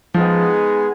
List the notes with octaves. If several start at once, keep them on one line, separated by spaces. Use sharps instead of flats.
F3 G#3 B3 D#4 G#4